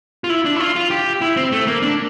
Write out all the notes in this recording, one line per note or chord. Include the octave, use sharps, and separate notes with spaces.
F4
E4
D4
E4
F4
F4
G4
E4
C4
A3
A#3
D4